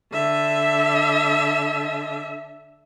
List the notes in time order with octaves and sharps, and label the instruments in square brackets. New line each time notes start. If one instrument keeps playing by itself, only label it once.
[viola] D3 E5